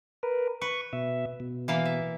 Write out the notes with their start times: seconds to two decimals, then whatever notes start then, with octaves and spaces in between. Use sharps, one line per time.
0.23 A#4 B4
0.62 B4 C#6
0.93 B2 E5
1.40 B2
1.68 E3 A#3 F5
1.85 E5